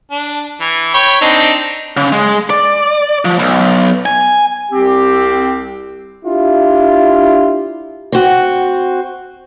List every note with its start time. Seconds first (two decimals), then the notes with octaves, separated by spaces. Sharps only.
0.11 D4
0.61 E3
0.94 C#5 G5 B5
1.21 C4 D4 D#4
1.97 C#3
2.12 G#3
2.50 D5
3.25 F3
3.39 B1
4.06 G#5
4.71 C2 C4 G4
6.24 D4 E4 F4 G4
8.12 C4 F#4